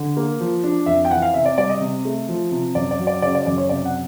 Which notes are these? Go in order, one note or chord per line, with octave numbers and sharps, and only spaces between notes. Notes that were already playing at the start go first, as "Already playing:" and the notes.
Already playing: D3
A#3
F3
D4
F2 E5
G5
E3 F#5
F5
C3 E5
D5
G3 D5
D#5
C3
A3
F3
C3
F#2 D5
D5
F#3
D5
C#3 D5
D5
F#2 D5
C#5
C3 D5
F#5